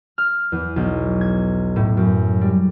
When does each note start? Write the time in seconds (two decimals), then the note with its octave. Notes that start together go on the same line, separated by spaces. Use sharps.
0.18 F6
0.52 E2
0.76 B1
1.21 G#6
1.76 A2
1.97 F#2
2.41 G3